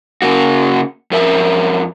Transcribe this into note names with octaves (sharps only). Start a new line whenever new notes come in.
C#3 A#3 F#4
F2 A#4 E5